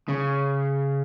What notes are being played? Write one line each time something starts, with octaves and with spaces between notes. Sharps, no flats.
C#3